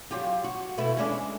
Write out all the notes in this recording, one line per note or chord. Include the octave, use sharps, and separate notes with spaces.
F#3 F4 G4
F#4
B2 A3 E4
G#3 C#4 D4